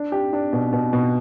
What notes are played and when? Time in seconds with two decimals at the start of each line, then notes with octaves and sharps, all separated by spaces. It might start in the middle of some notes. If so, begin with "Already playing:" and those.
Already playing: D4
0.12 G4
0.33 D4
0.53 B2
0.73 B2
0.93 B2